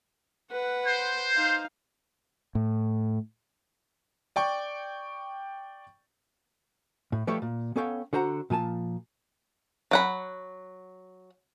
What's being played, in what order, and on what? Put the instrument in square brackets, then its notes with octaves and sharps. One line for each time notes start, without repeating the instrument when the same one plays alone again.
[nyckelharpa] B4 F#5
[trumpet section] C5
[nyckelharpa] D#4 F5
[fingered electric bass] A2
[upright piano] D5 G5 C#6
[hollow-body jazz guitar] A2
F3 G3 A3 G4 B4 C#5
A#2
B3 C#4 A4 C#5 F5 G5
D3 F#4 C5 F#5 A#5
A#2 F3 G#5 A5
[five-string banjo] F#3 F#5 B5